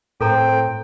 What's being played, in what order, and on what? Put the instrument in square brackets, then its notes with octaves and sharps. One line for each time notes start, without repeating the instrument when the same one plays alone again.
[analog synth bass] A2 [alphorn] C4 [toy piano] A4 A#4 A#5 [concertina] G5